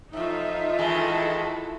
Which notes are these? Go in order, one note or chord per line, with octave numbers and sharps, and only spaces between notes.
F2 A2 D#4 F4 E5
D#3 E3 G#3 E4 A4